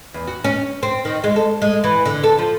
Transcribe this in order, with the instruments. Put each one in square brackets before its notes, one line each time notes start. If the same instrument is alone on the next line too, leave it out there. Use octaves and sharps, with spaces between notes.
[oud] E2
F#4
C#4
C4
D#3
G#3
A4
G#3
E3
D3
A4
F3